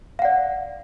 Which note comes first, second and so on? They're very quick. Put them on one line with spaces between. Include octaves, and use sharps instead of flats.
F5 F#5 D5